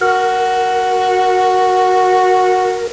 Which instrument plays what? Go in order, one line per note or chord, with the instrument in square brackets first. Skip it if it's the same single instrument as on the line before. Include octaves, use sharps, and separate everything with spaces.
[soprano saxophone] F#4 [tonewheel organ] A#4